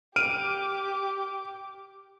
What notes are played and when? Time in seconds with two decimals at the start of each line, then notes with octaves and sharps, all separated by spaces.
0.16 G4 D6 F6 D7 D#7